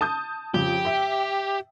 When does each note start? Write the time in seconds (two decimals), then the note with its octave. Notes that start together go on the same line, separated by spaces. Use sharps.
0.01 A5 D#6 G6
0.54 F2 C#3 G4
0.85 E5 G5